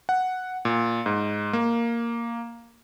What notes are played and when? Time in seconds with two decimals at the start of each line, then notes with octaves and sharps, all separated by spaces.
0.09 F#5
0.65 A#2
1.06 G#2
1.53 A#3